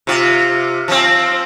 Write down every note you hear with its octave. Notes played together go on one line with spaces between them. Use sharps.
C3 F4
F3 C4